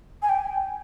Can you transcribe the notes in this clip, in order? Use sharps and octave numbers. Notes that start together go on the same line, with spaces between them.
G#5
G5